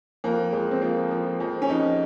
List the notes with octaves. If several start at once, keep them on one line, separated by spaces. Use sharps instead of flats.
F2 A#3
F2 G#3
C4
F3 A#3
F3
F2
C#4
F2 D#4